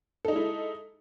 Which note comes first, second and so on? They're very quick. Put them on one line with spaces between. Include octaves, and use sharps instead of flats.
A4 D#4 G#3 E4